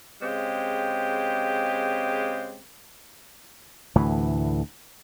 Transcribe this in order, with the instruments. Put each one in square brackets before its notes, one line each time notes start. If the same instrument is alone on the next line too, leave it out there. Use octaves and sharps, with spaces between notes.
[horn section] C#3 G#3 C4 G4
[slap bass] D2 A2 E3